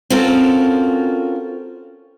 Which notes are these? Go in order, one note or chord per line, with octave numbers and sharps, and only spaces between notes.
C4 C#4 F4 F#4 A4 A#4